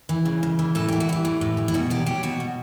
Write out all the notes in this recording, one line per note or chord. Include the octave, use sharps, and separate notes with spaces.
E3
C#3
C#3
E3
A2 A4
E3 G4
F#4
E3 G4
A2
A2
E3
E4
B2 F#4
F#3 G4
F#3 G4
B2 F#4
B2